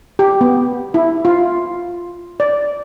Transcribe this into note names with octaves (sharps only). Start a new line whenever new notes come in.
G4
B3
E4
F4
D5